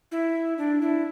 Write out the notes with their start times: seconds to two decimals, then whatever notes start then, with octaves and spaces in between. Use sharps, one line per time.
0.12 E4
0.58 D4
0.81 E4